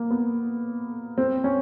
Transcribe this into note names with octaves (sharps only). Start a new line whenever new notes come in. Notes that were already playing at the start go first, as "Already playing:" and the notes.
Already playing: A#3
B3
C4
C#4